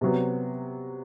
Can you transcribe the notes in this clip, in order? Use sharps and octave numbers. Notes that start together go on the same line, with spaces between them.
C3 F#3 B3